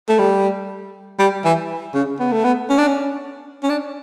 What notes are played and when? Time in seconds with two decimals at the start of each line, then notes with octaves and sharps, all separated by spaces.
0.09 A3
0.19 G3
1.19 G3
1.45 E3
1.94 C#3
2.20 B3
2.32 A3
2.44 B3
2.70 C#4
2.78 D4
2.87 C#4
3.63 C#4
3.69 D4